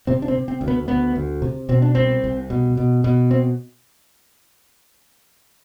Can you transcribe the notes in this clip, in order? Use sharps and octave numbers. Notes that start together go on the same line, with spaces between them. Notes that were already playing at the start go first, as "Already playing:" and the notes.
C3 C4
D4
C4
C3
C4
D2
B3
D2 B3
D2
C3
B2 C4
D4
C2 C4
C2
B2
B2
B2
C4